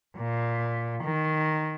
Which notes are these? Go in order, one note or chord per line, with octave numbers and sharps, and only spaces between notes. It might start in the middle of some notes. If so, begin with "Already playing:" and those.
A#2
D#3